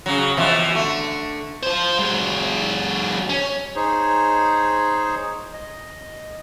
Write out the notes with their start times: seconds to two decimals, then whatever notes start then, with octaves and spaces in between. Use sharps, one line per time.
0.06 C#3 F#3
0.37 B2 E3 F3
0.75 D3 A3
1.63 F4 C5
1.99 F#3 G#3
3.30 C#4
3.76 D#4 G#4 C5 C#5
5.53 D#5